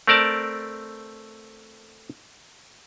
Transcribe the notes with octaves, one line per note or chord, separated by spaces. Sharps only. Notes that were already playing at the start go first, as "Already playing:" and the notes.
A3 C4 A#4 D5 A5